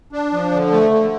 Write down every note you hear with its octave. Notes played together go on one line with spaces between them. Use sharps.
D4
F3
D3
A3
D3